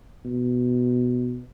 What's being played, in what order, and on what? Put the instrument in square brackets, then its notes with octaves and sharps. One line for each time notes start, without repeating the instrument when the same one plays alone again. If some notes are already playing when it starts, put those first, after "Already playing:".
[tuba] B2